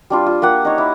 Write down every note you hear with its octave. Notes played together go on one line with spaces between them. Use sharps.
G3 D4 F4
F4
A#3 G4 F#5
D#4 C#5
E4